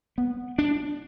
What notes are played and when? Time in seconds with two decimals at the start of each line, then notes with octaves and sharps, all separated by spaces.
0.18 B3
0.58 D4